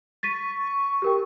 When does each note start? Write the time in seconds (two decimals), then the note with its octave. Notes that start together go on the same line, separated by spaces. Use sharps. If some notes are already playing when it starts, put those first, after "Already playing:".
0.23 C#6 A6 B6 D#7
1.02 G4 A#4 G5